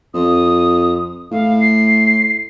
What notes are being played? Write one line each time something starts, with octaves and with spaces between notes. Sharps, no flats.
F2 D#6
A2 F5
C7